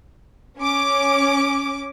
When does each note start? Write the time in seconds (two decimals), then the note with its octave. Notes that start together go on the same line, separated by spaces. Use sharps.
0.59 C#4 D6